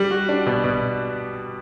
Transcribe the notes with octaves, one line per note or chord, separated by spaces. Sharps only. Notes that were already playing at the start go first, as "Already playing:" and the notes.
Already playing: G3
F#4
D4
B2
B2